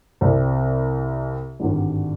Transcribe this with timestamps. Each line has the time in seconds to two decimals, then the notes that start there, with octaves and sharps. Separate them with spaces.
0.21 C2 C3 G3
1.60 G#1 G2 D3 G3